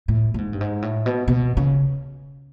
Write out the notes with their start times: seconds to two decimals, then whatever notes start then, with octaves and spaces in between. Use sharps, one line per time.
0.08 A2
0.34 A2
0.38 G#2
0.53 G2
0.61 G#2
0.82 A2
1.06 B2
1.28 B2
1.57 C#3